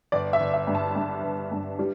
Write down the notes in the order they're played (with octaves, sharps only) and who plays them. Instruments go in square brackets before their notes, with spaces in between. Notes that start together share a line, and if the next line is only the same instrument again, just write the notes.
[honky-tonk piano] G1 D5
E5
G1
E5
G2
A5
G2
G1
G2
G3